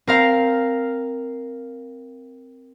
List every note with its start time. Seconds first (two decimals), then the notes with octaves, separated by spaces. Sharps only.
0.07 C4 A#4 F5